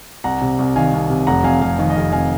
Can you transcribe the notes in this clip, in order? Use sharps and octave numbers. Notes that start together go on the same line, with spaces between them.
C2 F#5 A#5
C3
C2
D#3 F5 G#5
C2
C3
F1 F#5 A#5
F2 F5 G#5
F1 F5
D#3 F5
D#5
F1 F5
F2 F5 G#5